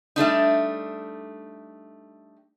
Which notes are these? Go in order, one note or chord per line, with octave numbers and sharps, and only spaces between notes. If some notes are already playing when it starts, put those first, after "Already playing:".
G3 A3 D4 D#4